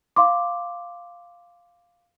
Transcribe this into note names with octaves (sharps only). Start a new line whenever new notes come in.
F5 C6 D6